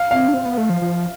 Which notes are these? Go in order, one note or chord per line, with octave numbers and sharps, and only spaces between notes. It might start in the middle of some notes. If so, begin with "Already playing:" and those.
Already playing: F5
C4 F5
D4
C4
B3
A3
F3
F3